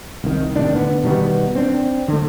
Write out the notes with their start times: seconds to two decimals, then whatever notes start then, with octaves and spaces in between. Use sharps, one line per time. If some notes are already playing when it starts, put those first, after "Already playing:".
0.24 C2 D#3
0.56 A2 C3 D#3 D4
0.74 D3 B3
1.04 B2 D#3 G3 B3
1.55 C4 D4
2.08 D3 A3